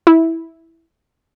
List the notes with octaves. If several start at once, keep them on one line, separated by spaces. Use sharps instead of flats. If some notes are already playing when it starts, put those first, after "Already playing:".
E4